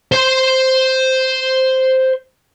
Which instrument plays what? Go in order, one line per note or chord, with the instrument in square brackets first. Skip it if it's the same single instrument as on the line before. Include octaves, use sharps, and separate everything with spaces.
[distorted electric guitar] C5 C6